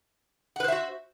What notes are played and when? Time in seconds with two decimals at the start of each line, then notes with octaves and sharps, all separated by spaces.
0.56 F#5
0.60 B4
0.64 C5
0.68 E5
0.72 F#4